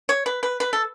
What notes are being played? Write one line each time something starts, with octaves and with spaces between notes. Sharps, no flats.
C#5
B4
B4
B4
A4